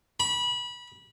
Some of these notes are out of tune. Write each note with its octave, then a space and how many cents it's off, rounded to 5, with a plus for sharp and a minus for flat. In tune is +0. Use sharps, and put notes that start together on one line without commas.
B5 -25